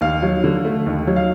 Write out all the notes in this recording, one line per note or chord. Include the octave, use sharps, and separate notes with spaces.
D#2 F5
F#3
D3
A3
D#2
F#3
F5